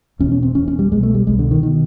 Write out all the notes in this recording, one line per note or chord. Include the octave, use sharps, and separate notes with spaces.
E1 E2 B2 C#4
C#4
C4
E1 E2 B2 C#4
C#4
G3
C2 B2 G#3
A3
G3
C2 B2 G#3
D3
D#3
B2 D#3